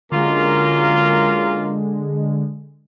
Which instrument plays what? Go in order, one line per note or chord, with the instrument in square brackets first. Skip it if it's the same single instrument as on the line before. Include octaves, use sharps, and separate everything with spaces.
[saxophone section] F#2 A#3 F4 [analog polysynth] D3 G#3